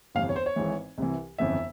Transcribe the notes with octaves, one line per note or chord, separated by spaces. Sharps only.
G1 F2 C3 E3 F5
C#5
C5
C#5
G#1 G#2 E3
C2 C3 E3
G1 F2 C#3 E3 E5